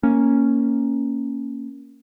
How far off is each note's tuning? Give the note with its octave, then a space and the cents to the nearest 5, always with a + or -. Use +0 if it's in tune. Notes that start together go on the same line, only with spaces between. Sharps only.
A#3 +0 C#4 +0